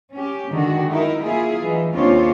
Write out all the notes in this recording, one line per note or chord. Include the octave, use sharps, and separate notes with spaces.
C#4 G4
D3 D#3 G#3 F#4
D#4 E4 A#4
A#3 E4 F4 G#4
E3 D#4
D#2 C#3 C4 D4 F4 C#5